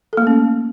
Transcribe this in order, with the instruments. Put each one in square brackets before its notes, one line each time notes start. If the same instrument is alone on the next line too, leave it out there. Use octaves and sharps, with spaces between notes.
[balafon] A4
A#3
A3
C#4